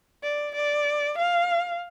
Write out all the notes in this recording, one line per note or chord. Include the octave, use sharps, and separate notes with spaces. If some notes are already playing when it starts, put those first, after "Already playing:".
D5
D5
F5